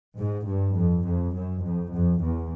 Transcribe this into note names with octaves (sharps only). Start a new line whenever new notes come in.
G#2
G2
F2
F2
F#2
F2
F2
E2